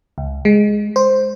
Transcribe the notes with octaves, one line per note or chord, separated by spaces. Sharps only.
C#2
G#3
C5